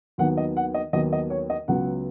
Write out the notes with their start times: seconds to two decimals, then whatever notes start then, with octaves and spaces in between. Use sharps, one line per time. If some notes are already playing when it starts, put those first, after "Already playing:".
0.18 D#2 D#3 F#3 B3 F#5
0.37 D#5
0.57 F#5
0.74 D#5
0.93 D#2 D#3 F#3 B3 D#5
1.13 D#5
1.30 C#5
1.50 D#5
1.68 C#2 C#3 F#3 B3 F#5